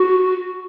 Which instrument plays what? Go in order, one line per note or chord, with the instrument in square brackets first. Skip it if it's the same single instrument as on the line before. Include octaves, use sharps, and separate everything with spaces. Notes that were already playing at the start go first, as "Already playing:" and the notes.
Already playing: [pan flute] F#4